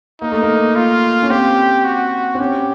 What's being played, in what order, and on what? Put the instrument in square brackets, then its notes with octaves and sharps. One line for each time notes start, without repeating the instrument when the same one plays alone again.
[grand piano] A#3 [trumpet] D#4
[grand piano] A3
A#3
[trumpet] F4
[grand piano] C#4
[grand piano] C4 [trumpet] G4
[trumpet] F#4
[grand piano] C4
[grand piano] C#4 [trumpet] G4